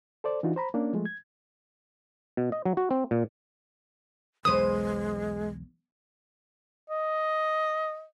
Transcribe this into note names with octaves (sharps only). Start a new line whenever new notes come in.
A4 C5 D5
E3 D4 D#4 F4 F#4
C5 A#5 B5
A#3 C#4 D4
F3 G#3 A3
G#6
B2
D#5
F#3
F#4
C4
A#2
E1 B1 E2 G#3 B4 C5 D#6
D#5